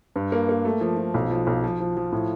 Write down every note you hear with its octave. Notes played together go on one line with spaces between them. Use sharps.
G2
A#3
A#3
A3
F3
F3
B1
F3
B1
F3
F3
F3
A2